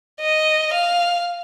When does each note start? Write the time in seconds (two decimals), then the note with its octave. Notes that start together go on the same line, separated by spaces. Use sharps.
0.21 D#5
0.74 F5